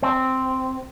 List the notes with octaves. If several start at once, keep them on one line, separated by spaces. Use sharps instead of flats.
C4